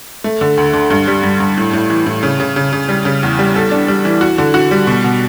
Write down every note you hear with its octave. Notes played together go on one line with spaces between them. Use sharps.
A3
D3
D2
D3
G2
G3
G2
G2
A2
A2
E3
A2
C#3
C#3
C#3
C#3
G3
C#3
E2
G3
A4
D4
G3
E3
F#4
D3
F#4
G3
B2
B2